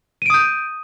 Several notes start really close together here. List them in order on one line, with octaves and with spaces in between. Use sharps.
D#7 D7 D#6 G6